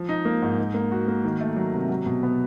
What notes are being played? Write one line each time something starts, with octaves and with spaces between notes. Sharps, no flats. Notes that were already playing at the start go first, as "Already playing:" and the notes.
Already playing: F3
D#4
A#3
G#2
D#4
A#3
F#4
A#3
D#3
A3
F#3
C3
F#3
B2
B3